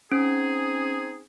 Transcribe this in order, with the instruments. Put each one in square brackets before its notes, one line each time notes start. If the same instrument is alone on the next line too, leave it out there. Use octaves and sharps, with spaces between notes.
[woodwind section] C4 D#4 G#4 [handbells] C#4